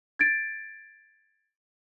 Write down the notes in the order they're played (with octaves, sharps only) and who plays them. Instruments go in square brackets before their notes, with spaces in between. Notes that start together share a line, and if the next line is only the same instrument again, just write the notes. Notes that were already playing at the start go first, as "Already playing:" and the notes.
[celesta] G#6 A6 D7